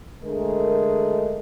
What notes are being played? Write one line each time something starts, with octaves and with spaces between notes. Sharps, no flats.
D3 G#3 A3 G#4 A#4